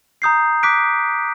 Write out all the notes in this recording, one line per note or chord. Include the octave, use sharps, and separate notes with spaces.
A#5 D#6 G6 C7
D6 F#6 B6 D7